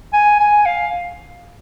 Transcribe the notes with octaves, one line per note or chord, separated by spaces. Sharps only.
G#5
G#5
F5